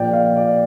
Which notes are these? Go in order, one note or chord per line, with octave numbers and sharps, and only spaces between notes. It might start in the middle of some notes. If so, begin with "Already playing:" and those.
Already playing: A#1 A#2 A#3 D5 G5
F5
D5